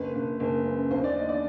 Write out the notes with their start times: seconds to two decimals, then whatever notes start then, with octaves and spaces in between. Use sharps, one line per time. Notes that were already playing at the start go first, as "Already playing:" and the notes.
Already playing: F#1 B4
0.15 F#1
0.40 F#1
0.65 F#2
0.91 D#2 C5
1.04 D5
1.16 D#3 D#5
1.29 D5